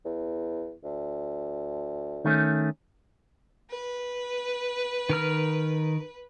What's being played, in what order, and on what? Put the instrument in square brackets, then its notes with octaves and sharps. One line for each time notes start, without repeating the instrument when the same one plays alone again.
[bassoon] E2
D2
[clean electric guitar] D#3 A3 C#4
[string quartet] B4
[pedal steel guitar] D#3 A#4 F6